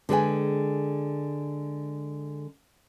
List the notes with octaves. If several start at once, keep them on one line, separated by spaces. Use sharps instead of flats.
D3 G#3 G#4 B4 G5 G#5